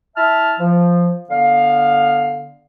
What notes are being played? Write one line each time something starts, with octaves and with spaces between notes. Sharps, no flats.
E4 E5 A5 F6
F3
D3 B3 F5